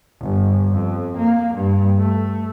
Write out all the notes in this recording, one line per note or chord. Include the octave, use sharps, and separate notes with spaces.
G1
F2
A#3
G2
A3